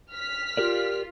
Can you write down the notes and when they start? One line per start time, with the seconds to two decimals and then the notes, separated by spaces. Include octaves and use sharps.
0.12 F6 B6
0.57 F4 G4 A#4 D5